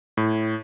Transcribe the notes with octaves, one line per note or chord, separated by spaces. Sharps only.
A2